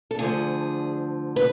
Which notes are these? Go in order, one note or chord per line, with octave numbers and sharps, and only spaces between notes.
A4
D2 D3 F3 G#4
B4